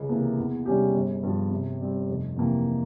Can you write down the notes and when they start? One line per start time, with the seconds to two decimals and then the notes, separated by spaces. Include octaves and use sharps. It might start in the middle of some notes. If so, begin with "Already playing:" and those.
Already playing: C#2
0.09 C3 E3 A#3
0.38 E2
0.66 C3 G3 C#4 G4
0.94 G1
1.23 G2 F3
1.51 C3
1.80 G3 C4
2.09 F1
2.36 F2 C3 E3 A#3